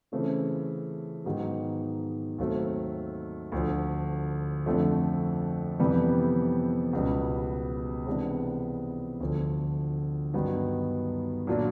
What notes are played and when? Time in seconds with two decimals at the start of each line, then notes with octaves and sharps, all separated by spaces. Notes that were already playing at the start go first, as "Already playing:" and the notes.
0.12 C#3 E3 A3 C4 F4
1.25 G#2 D#3 F#3 B3 D#4
2.38 D#2 D#3 F#3 A3 C4
3.52 D2 D3 F3
4.66 F2 D3 F3 A3
5.79 F2 C3 E3 G3 B3
6.93 C#2 B2 G3 B3
8.07 C3 E3 G#3 B3 D4
9.20 D2 D3 F3
10.34 G2 D#3 F#3 B3 D#4
11.47 A#2 F#3 A#3 D4 F4